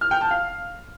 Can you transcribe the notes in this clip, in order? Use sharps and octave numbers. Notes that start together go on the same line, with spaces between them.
F6
G5
A5
F5